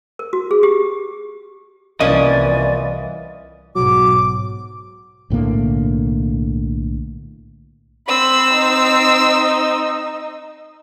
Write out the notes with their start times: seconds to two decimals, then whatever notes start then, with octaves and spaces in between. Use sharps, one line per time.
0.19 A#4
0.33 F#4
0.51 G#4
0.63 G4
2.00 C2 E3 F3 A#3 C#4 D5 D#5
3.76 B1 G#2 F#3 D6
5.30 B1 A2 D3 A#3
8.08 C4 B5 E6
8.56 D#4